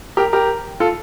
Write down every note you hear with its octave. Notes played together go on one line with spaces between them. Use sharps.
G4 A#4
G4 A#4
F4 A4